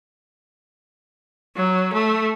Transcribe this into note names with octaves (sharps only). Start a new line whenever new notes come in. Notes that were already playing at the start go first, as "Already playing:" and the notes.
F#3
A3